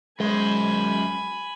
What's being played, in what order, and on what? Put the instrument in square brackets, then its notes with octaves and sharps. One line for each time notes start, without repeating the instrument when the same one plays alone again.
[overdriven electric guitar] F#2 C5 [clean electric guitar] G#3 [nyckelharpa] G#5 B5